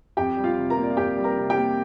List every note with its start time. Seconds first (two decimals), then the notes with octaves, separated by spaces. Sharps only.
0.17 F2 G4 G5
0.37 G3
0.44 F4 F5
0.58 C3
0.70 A#4 A#5
0.77 A#3
0.83 D5
0.90 F5
0.97 F2 G4 G5
1.17 G3
1.24 A#4 A#5
1.37 C3
1.50 G4 G5
1.58 A#3